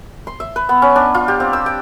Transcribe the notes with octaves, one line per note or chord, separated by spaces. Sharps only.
C6
E5
B4
B3
C#4
D4
F4
G4
C4
E6
G5